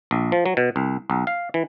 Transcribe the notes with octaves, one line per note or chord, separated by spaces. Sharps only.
A#1
F3
F#3
B2
C2
B1
F5
E3